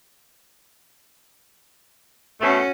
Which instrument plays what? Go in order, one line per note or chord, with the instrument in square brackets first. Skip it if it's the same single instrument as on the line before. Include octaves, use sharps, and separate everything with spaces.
[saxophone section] B2 A3 [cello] C#4 F#4